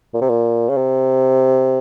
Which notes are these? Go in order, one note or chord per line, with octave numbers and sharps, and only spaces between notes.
A#2
C3
A#2
C#3
C3